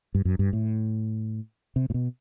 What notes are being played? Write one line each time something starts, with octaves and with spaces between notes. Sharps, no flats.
G2
F#2
G2
A2
C3
A2
B2